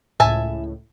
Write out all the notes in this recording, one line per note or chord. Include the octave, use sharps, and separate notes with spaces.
C#2 A2 E5 G#5 A5